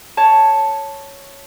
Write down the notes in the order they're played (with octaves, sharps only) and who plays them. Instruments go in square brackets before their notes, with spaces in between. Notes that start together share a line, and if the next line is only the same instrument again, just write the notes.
[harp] C#5 A5